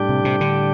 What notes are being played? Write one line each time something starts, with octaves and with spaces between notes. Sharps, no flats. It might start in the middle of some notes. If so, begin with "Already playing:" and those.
Already playing: A2 G3 D4 G4
C3
C3
D3